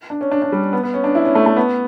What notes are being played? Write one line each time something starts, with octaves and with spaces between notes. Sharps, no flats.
D4
C#4
D4
D4
G3
B3
B3
C#4
D4
E4
C#4
A3
A3
B3